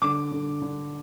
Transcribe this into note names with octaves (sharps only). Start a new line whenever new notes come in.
D3 D6
D3
D3